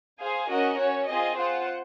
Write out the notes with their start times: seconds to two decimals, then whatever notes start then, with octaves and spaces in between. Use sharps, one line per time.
0.20 G#4 C5 F5 G#5
0.50 C#4 F#4 A#4 D#5 F#5
0.79 C#4 F#4 C#5
1.09 C4 F4 G#4 D#5 G#5
1.39 F4 C5 F#5